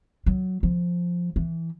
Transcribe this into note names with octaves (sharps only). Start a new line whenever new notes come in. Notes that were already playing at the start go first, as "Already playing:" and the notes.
F#3
F3
E3